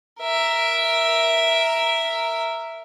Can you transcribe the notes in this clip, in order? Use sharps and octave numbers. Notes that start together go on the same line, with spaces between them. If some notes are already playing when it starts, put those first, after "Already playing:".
A#4 E5